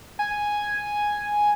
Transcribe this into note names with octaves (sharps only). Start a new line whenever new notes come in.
G#5